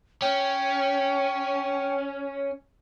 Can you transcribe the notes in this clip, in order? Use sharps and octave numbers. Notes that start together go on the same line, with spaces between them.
C#4 G5